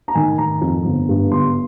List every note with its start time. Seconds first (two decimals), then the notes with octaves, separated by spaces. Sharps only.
0.08 A#5
0.15 D#3 G#5
0.38 D#3 A#5
0.61 F2
0.84 G1
1.09 G2
1.31 G1 C6